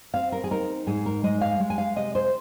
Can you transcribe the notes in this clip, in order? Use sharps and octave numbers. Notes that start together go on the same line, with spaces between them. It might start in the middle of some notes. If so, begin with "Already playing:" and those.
C4 F5
A#4
G#4
D#4 A#4
G#2 G#4
A#4
G#3 D#5
F5
G#3
G#5
F5
C3 D#5
C5